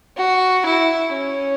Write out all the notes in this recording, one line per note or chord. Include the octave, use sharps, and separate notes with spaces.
F#4
E4
C#4